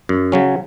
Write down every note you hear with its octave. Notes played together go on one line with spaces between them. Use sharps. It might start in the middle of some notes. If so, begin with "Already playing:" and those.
F#2
C#3 F#3 C#4